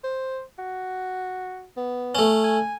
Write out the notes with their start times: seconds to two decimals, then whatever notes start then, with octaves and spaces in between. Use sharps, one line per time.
0.04 C5
0.59 F#4
1.77 B3
2.15 A3 C#4
2.44 G#5